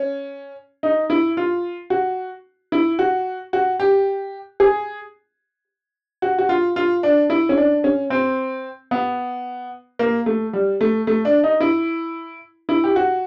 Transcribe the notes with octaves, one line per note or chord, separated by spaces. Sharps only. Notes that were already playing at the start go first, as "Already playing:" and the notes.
Already playing: C#4
D#4
E4
F4
F#4
E4
F#4
F#4
G4
G#4
F#4
F#4
F4
F4
D4
E4
C#4
D4
C#4
C4
B3
A#3
A3
G3
A3
A3
D4
D#4
E4
E4
G4
F#4